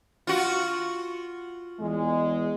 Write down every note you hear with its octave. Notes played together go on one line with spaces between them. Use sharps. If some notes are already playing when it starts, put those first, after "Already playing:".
F4 F#4
E2 G#3